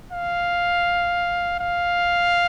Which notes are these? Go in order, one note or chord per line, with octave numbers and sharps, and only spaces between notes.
F5
F5